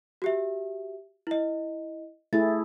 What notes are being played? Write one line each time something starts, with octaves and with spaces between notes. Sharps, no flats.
F#4 G4 E5
E4 D#5
A3 E4 G#4 A6